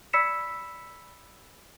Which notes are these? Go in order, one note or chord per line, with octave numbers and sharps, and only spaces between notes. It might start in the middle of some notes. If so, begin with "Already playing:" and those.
D5 B5 E6 B6 C#7 E7